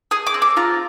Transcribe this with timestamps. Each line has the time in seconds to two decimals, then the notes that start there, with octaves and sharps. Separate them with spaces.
0.11 G#4 D#6
0.27 D6
0.34 C4
0.42 D6
0.57 F4 A#5